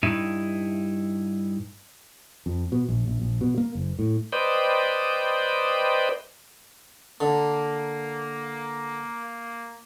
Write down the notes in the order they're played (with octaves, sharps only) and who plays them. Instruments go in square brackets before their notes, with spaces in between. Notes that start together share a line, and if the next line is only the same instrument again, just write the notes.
[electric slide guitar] G2 D#4 E4
[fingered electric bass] F2
B2
A#1
A#1
A#1
B2
A#3
F#1
A2
[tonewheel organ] B4 C5 D5 D#5 G5
[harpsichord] D3 [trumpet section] A#3